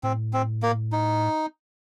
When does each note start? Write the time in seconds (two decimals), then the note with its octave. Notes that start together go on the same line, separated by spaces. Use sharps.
0.03 A2 C4
0.33 C4
0.63 A#3
0.92 D#4